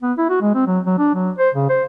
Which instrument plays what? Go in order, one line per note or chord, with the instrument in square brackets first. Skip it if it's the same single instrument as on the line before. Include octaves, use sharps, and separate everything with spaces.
[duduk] B3
E4
F#4
G#3
C4
F#3
F#3
D4
F#3
C5
C#3
C5